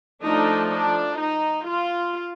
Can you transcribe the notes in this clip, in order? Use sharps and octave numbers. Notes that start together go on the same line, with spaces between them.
F3 A3 D4 D#4
D4
D#4
F4